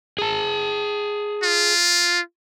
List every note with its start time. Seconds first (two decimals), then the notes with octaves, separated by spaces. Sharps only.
0.18 G#4 A5
1.43 F4